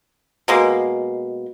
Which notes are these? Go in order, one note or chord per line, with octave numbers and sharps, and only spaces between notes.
B2 G#3 A#3